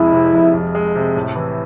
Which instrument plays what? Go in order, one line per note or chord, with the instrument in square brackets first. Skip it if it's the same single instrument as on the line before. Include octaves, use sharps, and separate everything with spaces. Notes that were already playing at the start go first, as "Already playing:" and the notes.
Already playing: [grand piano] F1 F2 G#3 [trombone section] E4
[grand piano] C3
F1
F2
G#3
C3
A2
E3